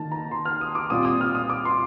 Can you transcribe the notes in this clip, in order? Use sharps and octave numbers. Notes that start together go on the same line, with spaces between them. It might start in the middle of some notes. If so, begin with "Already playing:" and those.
Already playing: D#3 A#3 D#4 A5
A#5
C6
F6
D#6
D6
A#2 G3 C4 F4 D#6
D#6
F6
D#6
D6
C6